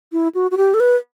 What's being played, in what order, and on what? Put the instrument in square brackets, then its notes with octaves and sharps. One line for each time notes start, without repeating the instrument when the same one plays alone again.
[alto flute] E4
F#4
F#4
G4
A4
B4